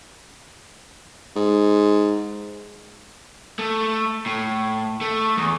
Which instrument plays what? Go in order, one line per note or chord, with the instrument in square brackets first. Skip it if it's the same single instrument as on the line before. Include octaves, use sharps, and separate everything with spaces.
[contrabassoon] G#2
[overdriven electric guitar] A3
A2
A3
E2